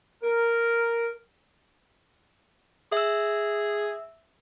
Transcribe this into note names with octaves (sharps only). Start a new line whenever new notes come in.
A#4
G#4 E5 E6